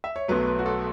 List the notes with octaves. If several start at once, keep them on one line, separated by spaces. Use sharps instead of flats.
E5
C#5
B1 B2 F#3 A3 B4
B4
F#4
A4